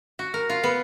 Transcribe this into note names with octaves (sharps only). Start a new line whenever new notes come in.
F#4
A#4
F4
B3